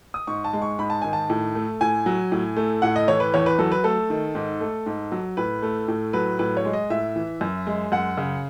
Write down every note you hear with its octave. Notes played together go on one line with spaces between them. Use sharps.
D#6
G#2 C#6
A5
G#3
C#6
G#2 B5
A5
D#3 G#5
A5
A2
A3
A2 G#5
F#3
A2
A3
A2 F#5
D#5
E3 C#5
B4
E2 C#5
B4
F#3 A4
B4
A3 A4
D#3
G#2
A3
G#2
F#3
A2 B4
A3
A2
F#3 B4
A2 B4
C#5
G#3
D#5
A2 E5
E3
F#2
G#3
F#2 F#5
C#3